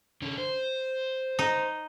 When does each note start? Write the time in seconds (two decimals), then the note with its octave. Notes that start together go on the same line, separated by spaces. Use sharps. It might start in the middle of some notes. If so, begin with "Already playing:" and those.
0.22 D3 C#4
0.38 C5
1.39 D#4